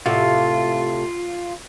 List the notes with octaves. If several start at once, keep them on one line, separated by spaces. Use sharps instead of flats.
A2 C3 F4 F#4